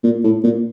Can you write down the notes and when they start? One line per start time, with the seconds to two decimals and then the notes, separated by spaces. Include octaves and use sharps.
0.03 A#2
0.24 A2
0.44 A#2